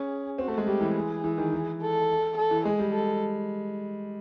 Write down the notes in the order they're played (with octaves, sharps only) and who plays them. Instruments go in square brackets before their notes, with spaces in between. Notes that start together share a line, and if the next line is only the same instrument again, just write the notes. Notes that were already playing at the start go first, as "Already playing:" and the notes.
Already playing: [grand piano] C#4 [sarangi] G#4
[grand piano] C4 [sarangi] F#4
[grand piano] A3
G#3
[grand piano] G3 [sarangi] G4
[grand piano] E3
[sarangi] G#4
[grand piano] E3
D#3
E3
[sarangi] A4
A4
[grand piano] E3
[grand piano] G#3 [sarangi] G#4
[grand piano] G3
[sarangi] A4